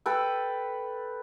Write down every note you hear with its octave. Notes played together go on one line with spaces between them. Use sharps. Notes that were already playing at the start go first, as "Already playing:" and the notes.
A4 B4 G5